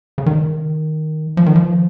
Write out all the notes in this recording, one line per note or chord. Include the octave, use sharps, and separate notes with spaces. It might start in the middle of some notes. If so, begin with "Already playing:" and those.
C#3
D#3
F3
D#3
F3